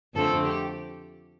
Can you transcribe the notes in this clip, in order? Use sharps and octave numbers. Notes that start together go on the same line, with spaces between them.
F2 D3 A3 C4 A4
G4